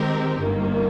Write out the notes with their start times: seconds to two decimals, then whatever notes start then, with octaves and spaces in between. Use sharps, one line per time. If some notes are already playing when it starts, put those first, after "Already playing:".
Already playing: D#3 G#3 C4 G4 A#4
0.41 G1 G2 D#3 A#3